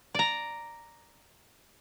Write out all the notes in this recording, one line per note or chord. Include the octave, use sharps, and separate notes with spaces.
D5 A#5